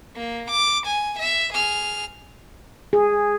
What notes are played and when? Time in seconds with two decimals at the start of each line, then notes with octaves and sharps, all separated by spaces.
0.16 A#3
0.51 D6
0.86 G#5
1.19 E5
1.53 G#4 F6
2.93 G#4